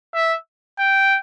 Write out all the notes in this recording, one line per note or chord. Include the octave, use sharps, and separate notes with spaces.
E5
G5